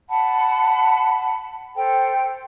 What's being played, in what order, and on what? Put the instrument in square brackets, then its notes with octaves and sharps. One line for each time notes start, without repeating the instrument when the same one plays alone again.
[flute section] F#5 A5 B5
A4 C5 G5